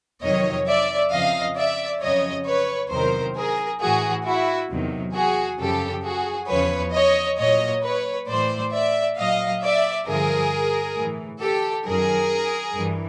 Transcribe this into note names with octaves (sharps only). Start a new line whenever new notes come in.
F2 C3 D#3 F#3 C#5 D#5
D5 E5
F2 C#3 F3 D#5 F5
D5 E5
F2 C#3 F#3 C#5 D#5
B4 C#5
E2 C3 D#3 F#3 A#4 C5
G#4 A#4
A2 E3 F#4 G#4
E4 F#4
E2 C3 D#3 F#3
F#4 G#4
F#2 C#3 F3 G4 A4
F#4 G#4
E2 C#3 F3 B4 C#5
C#5 D#5
A#2 F#3 C#5 D#5
B4 C#5
A2 E3 C5 D5
D5 E5
A#2 F#3 D#5 F5
D5 E5
G2 D3 F3 G#4 A#4
A2 E3
G4 A4
F#2 D#3 F#3 G#4 A#4
G2 E3